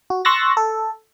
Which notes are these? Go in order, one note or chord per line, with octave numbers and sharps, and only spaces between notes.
F#4
C6 C#6 E6 F#6 A6 A#6
A4